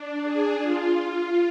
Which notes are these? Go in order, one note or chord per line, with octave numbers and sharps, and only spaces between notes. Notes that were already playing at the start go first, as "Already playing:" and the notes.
Already playing: D4
G#4
F4